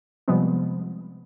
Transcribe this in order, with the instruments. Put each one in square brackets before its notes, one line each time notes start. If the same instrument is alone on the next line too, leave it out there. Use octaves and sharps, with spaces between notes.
[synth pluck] C3 F3 G3 G#3 B3 C4